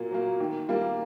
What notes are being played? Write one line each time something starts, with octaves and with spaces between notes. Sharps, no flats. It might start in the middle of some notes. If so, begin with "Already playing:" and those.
Already playing: A#2 F#3 A#3
F#3 A#3
D#3
G3 A#3